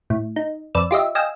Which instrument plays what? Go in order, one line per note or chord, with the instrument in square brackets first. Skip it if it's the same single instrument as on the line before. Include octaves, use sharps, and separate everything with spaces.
[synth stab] A2
D#4
F2 B4 D5 E6
F4 G4 D#5 E5
D#5 F5 G5 G#5 E6